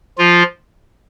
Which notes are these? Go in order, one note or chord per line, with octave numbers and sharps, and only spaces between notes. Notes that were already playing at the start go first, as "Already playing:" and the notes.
F3 F4